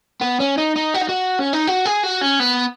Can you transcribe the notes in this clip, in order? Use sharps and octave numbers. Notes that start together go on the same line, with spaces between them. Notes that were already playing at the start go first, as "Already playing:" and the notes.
B3
C#4
D#4
D#4
F#4
D#4
F#4
C#4
D#4
F#4
G#4
F#4
C#4
B3